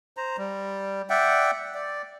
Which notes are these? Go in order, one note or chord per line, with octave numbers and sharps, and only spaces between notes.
C5 A#5
G3
D5 E5 F#5 G5
D5